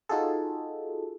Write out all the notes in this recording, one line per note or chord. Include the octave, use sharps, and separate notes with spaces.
D#4 F4 F#4 G#4 A4